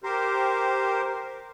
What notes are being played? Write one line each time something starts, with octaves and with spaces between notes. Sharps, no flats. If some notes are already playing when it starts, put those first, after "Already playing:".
G4 A#4 C5